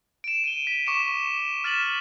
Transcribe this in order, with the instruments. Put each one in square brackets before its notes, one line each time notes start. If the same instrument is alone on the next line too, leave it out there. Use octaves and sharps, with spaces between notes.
[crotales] D7 E7
D#7 E7 G7
B6 E7
C#6 D6 C#7 E7
F6 A6 B6 E7 F#7